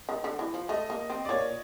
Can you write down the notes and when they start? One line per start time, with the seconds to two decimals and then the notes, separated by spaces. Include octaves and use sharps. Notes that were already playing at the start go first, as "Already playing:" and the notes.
0.09 D#3
0.24 D3
0.39 E3
0.54 F3
0.69 A3 D#5
0.90 A#3
1.10 C4
1.25 D5
1.29 A#3 C#5